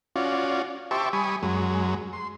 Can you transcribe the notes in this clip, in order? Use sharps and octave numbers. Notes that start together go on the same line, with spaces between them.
C#4 F4 F#4 D5
G4 C5 E5 A5 C#6 D6
G3 G#5 B5 C#6 D#6
F#2 F#3 G#3
C6